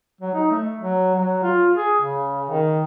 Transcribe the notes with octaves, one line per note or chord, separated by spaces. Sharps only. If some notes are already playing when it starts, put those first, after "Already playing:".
F#3
D#4
A3
F#3
F#3
F4
G#4
C#3
D#3